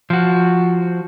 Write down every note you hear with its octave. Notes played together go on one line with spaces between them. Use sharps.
F3 F#4